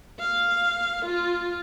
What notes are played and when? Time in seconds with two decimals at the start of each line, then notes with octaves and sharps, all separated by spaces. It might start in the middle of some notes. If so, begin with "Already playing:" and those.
0.20 F5
1.06 F4